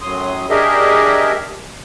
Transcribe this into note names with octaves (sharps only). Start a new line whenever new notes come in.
F#2 A2 F#3 C6 D#6
D4 G4 G#4 A#4 D#5 E5